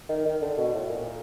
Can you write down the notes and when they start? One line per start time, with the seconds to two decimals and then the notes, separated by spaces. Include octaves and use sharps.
0.09 D#3
0.25 D#3
0.42 D3
0.57 B2
0.73 A2
0.90 A#2